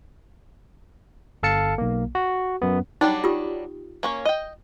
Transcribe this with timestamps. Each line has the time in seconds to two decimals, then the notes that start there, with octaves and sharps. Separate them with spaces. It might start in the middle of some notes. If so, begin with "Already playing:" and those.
1.43 G1 A4 F5 A5 C#7
1.78 B1 A#3
2.15 F#4
2.62 F#2 B3
3.01 F#3 G3 D4 D#4 G5
3.24 F4 G4 D#6
4.03 A#3 C#4 C#5
4.25 D#5 G5